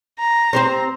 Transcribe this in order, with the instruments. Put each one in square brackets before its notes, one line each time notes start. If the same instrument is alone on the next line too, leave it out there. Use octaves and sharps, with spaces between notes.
[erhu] A#5
[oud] C4 G4 C5